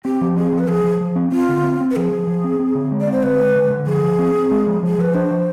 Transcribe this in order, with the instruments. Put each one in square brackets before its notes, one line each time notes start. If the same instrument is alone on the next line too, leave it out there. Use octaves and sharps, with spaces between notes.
[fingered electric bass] C4 [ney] G4
[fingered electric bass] F3
[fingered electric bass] C4 [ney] G#4
[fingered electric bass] F3
[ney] B4
[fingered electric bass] F3 [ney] G#4
[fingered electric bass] F3
F3
C4
[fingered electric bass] C4 [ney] F4
[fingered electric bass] D3
C4
C4
[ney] B4
[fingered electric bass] F3 [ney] G#4
[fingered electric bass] F3
F3
C4
C4
D3
G#3
[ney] D5
[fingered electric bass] C4 [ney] C5
[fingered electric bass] D3 [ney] B4
[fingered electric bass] G#3
D3
D3
[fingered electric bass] F3 [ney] G#4
[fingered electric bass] F3
C4
C4
G#3
F3
[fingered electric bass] F3 [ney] G#4
[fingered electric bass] F3 [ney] B4
[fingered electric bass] D4 [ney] C5
[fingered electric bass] F3